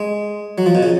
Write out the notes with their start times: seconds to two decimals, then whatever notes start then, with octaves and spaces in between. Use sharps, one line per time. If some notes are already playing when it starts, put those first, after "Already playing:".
Already playing: G#3
0.58 F#3
0.66 F3
0.75 B2
0.83 C#3